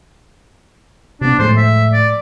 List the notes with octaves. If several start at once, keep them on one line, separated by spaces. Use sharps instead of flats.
C3 B3 D4
A2 F3 G#3 C5
E5
D5